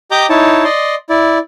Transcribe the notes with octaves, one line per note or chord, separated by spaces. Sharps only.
G4 D#5 A#5 D6 G6
D#4 E4 C#5 A5
D5 D#5 C6
E4 D5